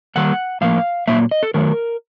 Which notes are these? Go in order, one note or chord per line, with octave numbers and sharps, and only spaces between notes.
D#3 G3 A#3 F#5
A2 F3 A#3 F5
A#2 F#3 A#3 E5
D#5
A4
D#3 F#3 A3 A#4